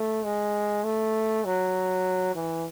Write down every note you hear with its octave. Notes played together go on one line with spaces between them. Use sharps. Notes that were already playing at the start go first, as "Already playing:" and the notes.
Already playing: A3
G#3
A3
F#3
E3